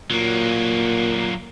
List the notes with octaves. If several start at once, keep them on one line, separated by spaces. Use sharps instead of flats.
A#2 F#3 A#3